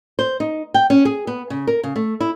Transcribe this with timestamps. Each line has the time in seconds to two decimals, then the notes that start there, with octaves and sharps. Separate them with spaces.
0.19 C5
0.40 D#4
0.74 G5
0.90 C#4
1.05 G#4
1.27 B3
1.50 C#3
1.67 A#4
1.83 C#3
1.96 A3
2.20 E4